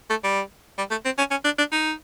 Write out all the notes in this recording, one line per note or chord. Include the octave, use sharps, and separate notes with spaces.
A3
G3
G3
A3
C4
C#4
C#4
D4
D4
D#4